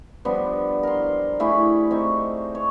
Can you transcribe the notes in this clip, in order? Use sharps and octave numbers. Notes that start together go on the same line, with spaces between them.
F3 G3 B3 D4
A#4 C6
A3 E4 G4 G#4
C4 D#4 C#6
C#5